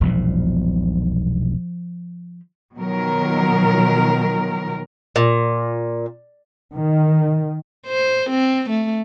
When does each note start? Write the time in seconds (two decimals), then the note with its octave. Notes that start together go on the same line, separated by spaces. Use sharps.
0.01 E1 B1 A#2 F3
2.78 B2 D#3 F3 F#3 A#4
5.16 A#2
6.72 D#3
7.87 C5
8.30 C4
8.70 A3